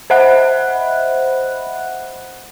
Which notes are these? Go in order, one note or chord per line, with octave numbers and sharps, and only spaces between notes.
C5 D#5 E5 F#5 B5 F#6